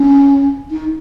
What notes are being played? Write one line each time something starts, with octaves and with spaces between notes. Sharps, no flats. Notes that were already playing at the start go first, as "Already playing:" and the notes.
Already playing: C#4
D#4